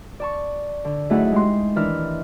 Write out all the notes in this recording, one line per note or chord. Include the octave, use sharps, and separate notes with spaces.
D5 A5 C#6
D3
F#2 A3 D#4 E4 G#4 F#5
G#3 G4 C6
D#3 E3 D4 E4 A#4 F6